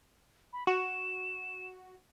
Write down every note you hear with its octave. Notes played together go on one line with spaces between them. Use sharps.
B5
F#4 E7